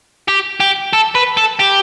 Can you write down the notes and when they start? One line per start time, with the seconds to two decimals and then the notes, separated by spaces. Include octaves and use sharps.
0.28 G4
0.60 G4
0.93 A4
1.15 B4
1.37 A4
1.59 G4